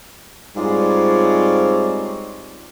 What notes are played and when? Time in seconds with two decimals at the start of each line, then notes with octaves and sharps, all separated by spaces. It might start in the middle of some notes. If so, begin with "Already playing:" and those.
0.56 G#2 G3 C4 F4 C#5 D5